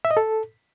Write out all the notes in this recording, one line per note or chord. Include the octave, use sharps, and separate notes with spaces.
E5
D#5
A4